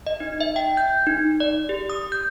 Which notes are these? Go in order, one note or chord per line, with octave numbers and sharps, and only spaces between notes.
D#5
D#4
E5
G5
G6
D#4
D5
G4
D#6
G6